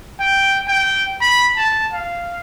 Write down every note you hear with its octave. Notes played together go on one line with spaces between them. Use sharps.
G5
G5
B5
A5
F5